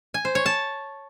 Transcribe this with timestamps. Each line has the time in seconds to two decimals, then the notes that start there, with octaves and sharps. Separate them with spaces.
0.14 G#5
0.25 C5
0.35 C#5
0.46 A5